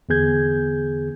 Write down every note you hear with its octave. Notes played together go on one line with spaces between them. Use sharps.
E2 D3 B3 G#4 G6 G#6